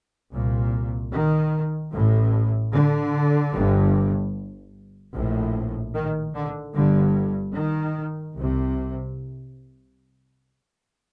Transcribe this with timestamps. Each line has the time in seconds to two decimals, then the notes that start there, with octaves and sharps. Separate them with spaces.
0.33 C2 A#2
1.14 D#3
1.93 A1 A2
2.73 D3
3.54 G1 G2
5.14 A#1 A2
5.95 D#3
6.35 D3
6.75 G1 G2 D3
7.55 D#3
8.36 C2 C3